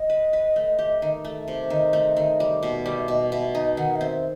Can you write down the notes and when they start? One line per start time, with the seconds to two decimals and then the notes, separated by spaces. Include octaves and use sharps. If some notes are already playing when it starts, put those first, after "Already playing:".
Already playing: D#5
0.10 B4
0.33 B4
0.56 A3
0.79 G4
1.02 D#3
1.25 A3
1.48 C3
1.70 D#3 D#5
1.93 A3
2.17 D#3
2.40 G3
2.63 B2
2.86 G3
2.97 E5
3.08 B2 D#5
3.31 B2 E5
3.54 D#4 D#5
3.77 D#3 F#5
3.96 D#5
4.01 C4 E5